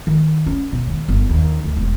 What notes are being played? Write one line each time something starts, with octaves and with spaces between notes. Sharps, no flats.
D#3
C#4
B2
D#3
G1
D#2
D2
E1